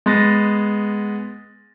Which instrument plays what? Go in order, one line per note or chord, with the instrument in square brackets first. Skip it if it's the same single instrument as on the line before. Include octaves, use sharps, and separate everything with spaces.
[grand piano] G#3 B3 C6 A6 A#6